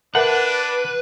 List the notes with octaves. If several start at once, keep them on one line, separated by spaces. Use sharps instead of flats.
D4 A#4 B4 E5 F#5 A5